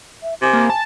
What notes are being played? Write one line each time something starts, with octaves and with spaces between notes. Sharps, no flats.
E5
C3 G#5
A#3
A5